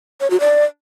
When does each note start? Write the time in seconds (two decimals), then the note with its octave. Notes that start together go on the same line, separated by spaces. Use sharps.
0.21 C#5
0.30 F#4
0.40 D5